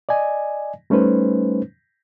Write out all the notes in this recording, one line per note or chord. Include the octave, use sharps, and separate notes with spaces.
D5 D#5 G#5
G3 A3 C#4 D#4 B4 C5